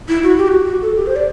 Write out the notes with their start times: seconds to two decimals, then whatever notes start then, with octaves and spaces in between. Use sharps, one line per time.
0.09 E4
0.23 F#4
0.38 G4
0.48 F#4
0.67 F#4
0.82 A4
0.96 G4
1.07 C5
1.16 D5